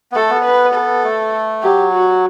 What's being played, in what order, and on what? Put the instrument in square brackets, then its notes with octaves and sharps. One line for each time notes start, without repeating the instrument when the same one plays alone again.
[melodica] B3
[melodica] A3 [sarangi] A4
[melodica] B3
[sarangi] B4
A4
[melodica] A3
[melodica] F#3 [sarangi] G4
[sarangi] F#4